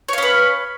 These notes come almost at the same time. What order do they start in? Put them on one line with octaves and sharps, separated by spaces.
C#5 F5 C#4 B4